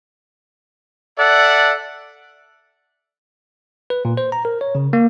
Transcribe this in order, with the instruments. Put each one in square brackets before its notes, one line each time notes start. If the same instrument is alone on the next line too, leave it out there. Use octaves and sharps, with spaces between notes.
[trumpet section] A4 D5 E5 F#5
[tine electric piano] B4
A#2
C5
A#5
A#4
C#5
C#3
A#3